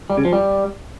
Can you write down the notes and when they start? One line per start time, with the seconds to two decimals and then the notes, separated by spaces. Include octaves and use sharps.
0.10 G3
0.17 C#3
0.25 F3
0.33 G3